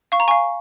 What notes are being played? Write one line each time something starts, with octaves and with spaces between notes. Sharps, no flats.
F5 C#6
A#5
F5 G#5 C#6